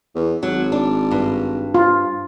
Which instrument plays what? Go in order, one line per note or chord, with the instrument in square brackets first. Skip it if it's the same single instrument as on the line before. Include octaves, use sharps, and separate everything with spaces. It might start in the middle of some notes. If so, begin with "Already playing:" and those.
[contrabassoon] E2
[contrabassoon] G#1 [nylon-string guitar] F#3
[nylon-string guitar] D4
G2
[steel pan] F4